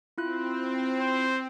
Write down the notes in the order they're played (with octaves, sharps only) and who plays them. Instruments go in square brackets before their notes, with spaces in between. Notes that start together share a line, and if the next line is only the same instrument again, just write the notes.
[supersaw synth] C4 [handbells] E4 F4 F#6
[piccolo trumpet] C5